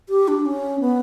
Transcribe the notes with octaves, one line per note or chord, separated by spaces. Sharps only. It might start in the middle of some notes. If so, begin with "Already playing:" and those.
G4
D4
C#4
B3